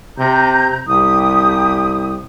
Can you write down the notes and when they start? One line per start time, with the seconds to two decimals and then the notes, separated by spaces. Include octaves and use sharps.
0.18 C3 A#5 G6
0.87 C2 G4 D#6